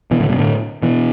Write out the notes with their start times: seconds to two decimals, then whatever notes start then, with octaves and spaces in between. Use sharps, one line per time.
0.11 B2 E3
0.20 A2 D3
0.29 G2 B2
0.38 A2 D3
0.82 B2 E3